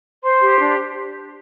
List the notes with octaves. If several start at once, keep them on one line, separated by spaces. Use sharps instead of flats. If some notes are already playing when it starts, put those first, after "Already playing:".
C5 C6
G4
D4